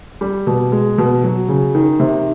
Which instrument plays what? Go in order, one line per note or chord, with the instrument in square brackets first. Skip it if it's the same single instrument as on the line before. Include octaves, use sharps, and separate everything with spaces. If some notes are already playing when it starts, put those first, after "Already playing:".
[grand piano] G3
B2
G#3
B2
F#3
C#3
D#3
C3